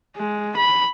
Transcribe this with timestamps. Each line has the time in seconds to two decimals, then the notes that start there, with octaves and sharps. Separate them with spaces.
0.16 G#3
0.57 B5